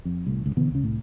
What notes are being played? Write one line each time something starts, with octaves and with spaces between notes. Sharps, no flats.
F2
C2 A2
G1 C#2
B2 D3 E3 B3
C#2 C#3
C2 A2